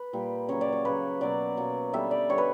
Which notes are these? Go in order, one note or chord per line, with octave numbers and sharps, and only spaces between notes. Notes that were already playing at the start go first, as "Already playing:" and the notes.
Already playing: B4
A#2 G3 A#3
C#3 F#3 A#3 C#5
D5
C#5
C#3 F#3 A#3 B4
B2 F#3 A#3 D5
B2 F#3 A#3
D3 G3 B3 E5
D5
D3 G3 B3 C#5
B4